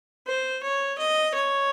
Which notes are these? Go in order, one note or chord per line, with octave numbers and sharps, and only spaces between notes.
C5
C#5
D#5
C#5